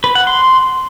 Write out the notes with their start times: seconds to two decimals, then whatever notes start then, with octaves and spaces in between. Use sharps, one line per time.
0.04 B4
0.15 F#5
0.27 C6